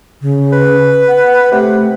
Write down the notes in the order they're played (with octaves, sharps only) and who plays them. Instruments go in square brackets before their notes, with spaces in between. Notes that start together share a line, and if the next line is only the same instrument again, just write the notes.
[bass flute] C#3
[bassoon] B4
[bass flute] F#5
[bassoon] C3 [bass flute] A3